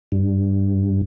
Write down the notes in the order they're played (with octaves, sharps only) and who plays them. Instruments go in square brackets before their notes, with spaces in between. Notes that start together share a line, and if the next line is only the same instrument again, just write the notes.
[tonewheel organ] G2